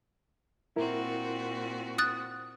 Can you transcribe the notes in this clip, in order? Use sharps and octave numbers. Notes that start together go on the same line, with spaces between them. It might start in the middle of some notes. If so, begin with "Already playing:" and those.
A#2 C4 E4 F#4 A#4
D#6 F#6 A6